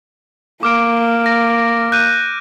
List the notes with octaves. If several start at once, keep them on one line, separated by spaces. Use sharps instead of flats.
A#3 D6 F6 D7
A#6
F#6 G6 D#7